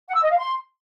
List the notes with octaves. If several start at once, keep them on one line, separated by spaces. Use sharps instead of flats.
F#5
E6
D#5
F5
C6